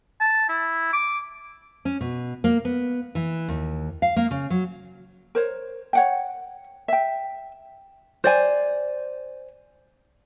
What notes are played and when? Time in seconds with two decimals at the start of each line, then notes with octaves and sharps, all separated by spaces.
0.20 A5
0.49 E4
0.93 D6
1.85 C#4
2.01 B2
2.44 A#3
2.65 B3
3.15 E3
3.49 D#2
4.02 F5
4.16 A#3
4.31 C#3
4.50 F#3
5.35 A#4 C5 C#5
5.93 C#5 F#5 G5
6.88 E5 G5
8.24 C5 D5 G#5